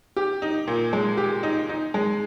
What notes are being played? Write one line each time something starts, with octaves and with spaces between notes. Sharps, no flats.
G4
D#4
A#2
G#3
G4
D#4
D#4
G#3